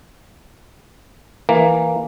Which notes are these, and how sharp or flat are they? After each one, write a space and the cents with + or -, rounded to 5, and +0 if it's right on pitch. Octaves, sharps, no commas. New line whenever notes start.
E3 +0 A#3 +0